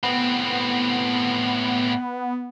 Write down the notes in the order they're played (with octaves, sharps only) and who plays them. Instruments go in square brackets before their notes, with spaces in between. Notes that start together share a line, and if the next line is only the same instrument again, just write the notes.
[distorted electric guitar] A2 C4 [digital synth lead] B3